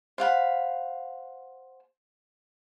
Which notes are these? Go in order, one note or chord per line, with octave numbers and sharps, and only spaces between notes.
C5 F5 F#5 B5